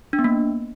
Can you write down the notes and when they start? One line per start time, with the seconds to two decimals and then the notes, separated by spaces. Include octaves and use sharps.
0.13 D4
0.19 B3
0.24 A#3